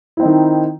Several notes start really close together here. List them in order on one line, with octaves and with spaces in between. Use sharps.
E4 C4 D#4 D#3